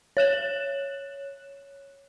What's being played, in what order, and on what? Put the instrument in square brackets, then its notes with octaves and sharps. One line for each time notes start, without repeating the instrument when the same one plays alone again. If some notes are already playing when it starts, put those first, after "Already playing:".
[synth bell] C#5 F#6 E7 F#7